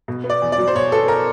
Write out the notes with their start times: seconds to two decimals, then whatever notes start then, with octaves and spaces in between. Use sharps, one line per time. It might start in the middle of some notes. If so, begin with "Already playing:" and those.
0.08 B2
0.24 B3
0.30 D5
0.42 E2
0.52 D5
0.58 F#3
0.68 C5
0.75 B2 C#5
0.92 B3 A4
1.08 A#4